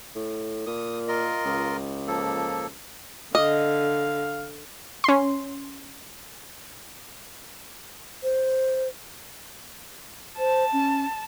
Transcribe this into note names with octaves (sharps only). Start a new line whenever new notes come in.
A2
A#2 D#6
F4 A#4 D#5
C#2
F3 A#3 A4
D3 D#5 F5
C#4 C6
C5
C5 A5
C#4